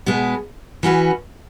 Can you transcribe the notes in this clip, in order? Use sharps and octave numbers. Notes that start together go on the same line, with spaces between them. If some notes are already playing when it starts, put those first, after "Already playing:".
B2 G#3 B3
E3 C#4 F#4 B4